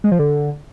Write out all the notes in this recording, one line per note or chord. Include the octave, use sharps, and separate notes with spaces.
G#3
F3
D3